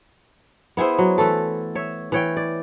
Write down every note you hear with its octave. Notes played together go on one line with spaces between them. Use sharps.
B3 E4 G#4 C5
F#3
E3 A3 A4
C#5 E5
E3 C#5 G5
D5